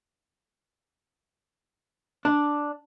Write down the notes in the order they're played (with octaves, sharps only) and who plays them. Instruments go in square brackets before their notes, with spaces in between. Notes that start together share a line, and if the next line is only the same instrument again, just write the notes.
[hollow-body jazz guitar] D4